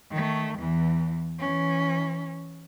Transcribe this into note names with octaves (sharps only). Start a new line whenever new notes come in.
D#3 A3
E2 E3
E3 C#4